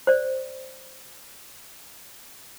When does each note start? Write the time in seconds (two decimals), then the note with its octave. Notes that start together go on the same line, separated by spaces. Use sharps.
0.07 C5 D5